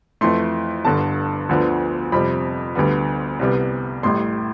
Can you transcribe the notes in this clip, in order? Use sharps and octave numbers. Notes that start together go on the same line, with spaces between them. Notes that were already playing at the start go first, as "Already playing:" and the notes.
F2 E3 A3 C6
G1 G2 D3 A5
D2 D3 F3 B3
F2 C3 G3 C4 B5
D2 D3 G3 B3
C2 C3 G3 B3
A1 A2 G3 C6